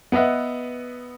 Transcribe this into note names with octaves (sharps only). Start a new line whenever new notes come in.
B3 B4 D#5 E5 F#5